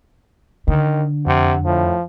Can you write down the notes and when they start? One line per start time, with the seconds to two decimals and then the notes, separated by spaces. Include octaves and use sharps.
0.68 D3 D#3
1.27 F2 C3 F#5
1.65 A2 F3